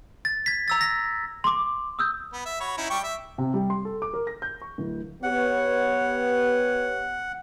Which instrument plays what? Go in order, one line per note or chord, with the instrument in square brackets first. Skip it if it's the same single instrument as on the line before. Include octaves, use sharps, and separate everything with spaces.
[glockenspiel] A6
G#6 B6
A#5 E6 A6
A#6
[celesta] C6 D6
D#6 E6 G6
[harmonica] B3
E5
F#4 C#5 B5
C#4 D#4 E4
G3 G5 C#6
E5
[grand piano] C3
G3
C6
A4
D6
A#4
A#6
G6
C#6
D1
[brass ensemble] B3 G4 C#5 [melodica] F#5